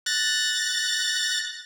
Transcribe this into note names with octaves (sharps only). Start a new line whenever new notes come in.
F#6 A6 A#6